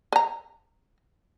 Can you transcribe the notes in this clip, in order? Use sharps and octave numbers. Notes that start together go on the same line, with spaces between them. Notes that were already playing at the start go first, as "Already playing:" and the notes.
B4 A#5